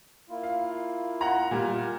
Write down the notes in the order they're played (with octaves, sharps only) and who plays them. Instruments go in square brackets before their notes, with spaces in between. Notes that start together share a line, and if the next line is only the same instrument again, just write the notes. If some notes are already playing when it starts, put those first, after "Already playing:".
[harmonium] A#3 E4 F4
[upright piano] F5
F#5 A#5
[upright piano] A#2 G3 [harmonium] A#4